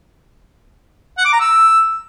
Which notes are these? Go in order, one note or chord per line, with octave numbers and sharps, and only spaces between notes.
F#5
D6
A#5
E6